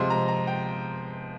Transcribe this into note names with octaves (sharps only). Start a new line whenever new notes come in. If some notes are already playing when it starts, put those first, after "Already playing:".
Already playing: C3 F3 G#3 C6
A#5
A#5
G5